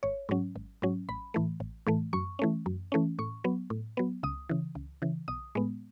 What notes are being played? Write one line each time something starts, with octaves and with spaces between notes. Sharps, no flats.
G#1 C#5
G#2 F#3 C#4
G#1
G#2 F#3 C#4
A1 B5
A2 E3 A3
A1
A2 E3 A3
F#2 C#6
E3 A3 C#4
F#2
E3 A3 C#4
A2 C#6
F#3 B3
A2
F#3 B3
C#2 D#6
C#3 E3
C#2
C#3 E3
B1 D#6
A2 G#3 B3